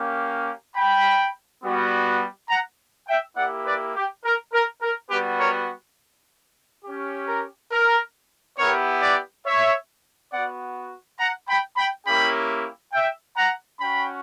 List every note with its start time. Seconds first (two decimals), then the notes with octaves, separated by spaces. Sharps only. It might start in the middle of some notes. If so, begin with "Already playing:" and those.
Already playing: A#3 C#4 G4
0.76 G5 B5
1.63 G3 B3 F#4
2.49 F#5 A#5
3.08 E5 G5
3.37 A#3 E4 G4 D5 F#5
3.66 B4 D5
3.95 G4
4.24 A#4
4.53 A#4
4.82 A#4
5.10 G3 B3 F#4 G4 B4
5.40 A#4 C#5
6.85 C#4 G4
7.28 A#4
7.72 A#4
8.58 B3 E4 G4 A#4 C#5
9.01 B4 D5
9.45 C#5 E5
10.32 B3 F#4 D5 F#5
11.19 F#5 A#5
11.48 G5 B5
11.77 G5 B5
12.06 A#3 C#4 E4 G4 G5 B5
12.93 E5 G5
13.37 F#5 A#5
13.80 C#4 F#4 G5 B5